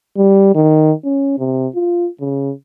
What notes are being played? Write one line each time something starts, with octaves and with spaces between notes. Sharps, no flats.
G3
D#3
C#4
C3
F4
C#3